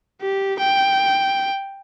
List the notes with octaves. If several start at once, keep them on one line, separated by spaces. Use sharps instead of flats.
G4
G5